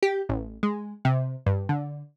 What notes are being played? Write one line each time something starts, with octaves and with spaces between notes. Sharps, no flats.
G4
A1
G#3
C3
G2
D3